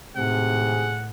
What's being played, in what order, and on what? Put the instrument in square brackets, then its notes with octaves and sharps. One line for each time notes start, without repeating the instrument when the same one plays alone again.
[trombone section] G#1 C3 G#4 [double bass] A2 [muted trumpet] F#5